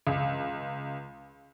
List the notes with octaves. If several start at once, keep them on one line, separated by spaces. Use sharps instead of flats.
C#2